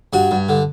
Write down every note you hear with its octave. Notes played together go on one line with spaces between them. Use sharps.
G2 F#4
G2
D3